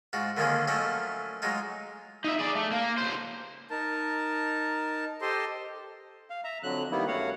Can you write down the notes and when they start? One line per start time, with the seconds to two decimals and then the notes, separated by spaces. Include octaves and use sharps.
0.13 G#2 F4 F#4
0.37 D3 D#3 F3 A#3 C#4 G#4
0.68 F3 F#3 A3 C#4 D#5 E5
1.42 F#3 G#3 D#4 F4
2.24 D#4 E5
2.39 G#4 D5
2.55 A3
2.71 A#3
2.98 C#2 C5
3.70 D#4 A#4 A5
5.22 G4 A4 C5 D#5 C6
6.30 F5
6.44 E5 A#5
6.63 F2 D3 F#3 F#6
6.91 D#3 G3 A#3 B3 E4
7.07 F#2 A3 F#4 C#5 F5 F#5